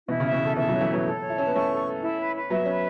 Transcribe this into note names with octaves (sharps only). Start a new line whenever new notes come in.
B2 E3 E4
C#3 E5
B2
C#3 A4
B2 E3 E5
C#3 F#3 C#5
E3 A3
F#3 B3 C#5
A4
C#5
E4
C#4 A5
B3
A3 C#4 C#6
A4
A4
E4
B4
B4
F#3 B3 E5
C#4 B4